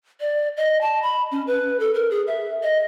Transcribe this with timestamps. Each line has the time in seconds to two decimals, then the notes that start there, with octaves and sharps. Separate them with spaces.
0.20 D5
0.57 D#5
0.81 A5
1.02 B5
1.31 C#4
1.47 B4
1.80 A4
1.94 A#4
2.11 G#4
2.27 E5
2.63 D#5